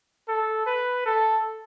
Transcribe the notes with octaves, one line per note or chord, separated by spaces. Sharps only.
A4
B4
A4